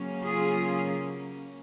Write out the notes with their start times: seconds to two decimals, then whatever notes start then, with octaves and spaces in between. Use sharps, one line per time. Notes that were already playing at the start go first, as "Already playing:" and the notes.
Already playing: C#3 F#3 A#3 C#4
0.23 F4 G#4